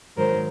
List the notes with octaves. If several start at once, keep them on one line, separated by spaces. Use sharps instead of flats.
G#2 D#3 F#3 A#4 C5